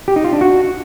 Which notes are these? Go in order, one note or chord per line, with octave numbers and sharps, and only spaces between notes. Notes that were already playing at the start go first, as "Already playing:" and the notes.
G4
D#4
F4
D4
F#4